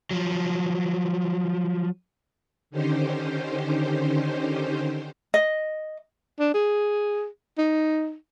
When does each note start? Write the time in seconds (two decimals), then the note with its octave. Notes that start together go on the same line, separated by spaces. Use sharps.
0.11 F3 F#3
2.70 D3 D#3 C#4 D#4 G4 C5
5.34 D#5
6.40 D4
6.54 G#4
7.58 D#4